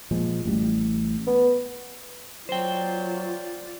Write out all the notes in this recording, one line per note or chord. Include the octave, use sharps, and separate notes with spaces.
A#2 F3 G#3
A1 A2 G3
B3
F#3 F4 C5 D5 G5